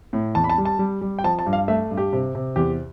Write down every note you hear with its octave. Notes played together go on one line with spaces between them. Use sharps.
A2
E2 A5
B5
A5
G3
A5
G3
G3
G5
F3 A5
A5
G2
F5
A3 E5
G2
G4
C3
C3
E2 G4